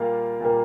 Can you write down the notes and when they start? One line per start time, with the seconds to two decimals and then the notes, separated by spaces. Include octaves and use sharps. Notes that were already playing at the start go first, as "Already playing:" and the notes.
Already playing: A#2 G3 A#3 F5
0.41 A#2 G3 A#3